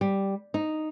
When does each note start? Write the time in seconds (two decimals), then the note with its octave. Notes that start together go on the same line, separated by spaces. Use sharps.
0.01 G3
0.54 D#4